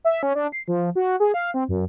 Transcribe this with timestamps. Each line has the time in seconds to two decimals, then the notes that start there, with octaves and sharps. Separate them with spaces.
0.05 E5
0.23 C#4
0.35 D4
0.52 C7
0.68 F3
0.95 F#4
1.20 G#4
1.34 F5
1.54 C4
1.69 F#2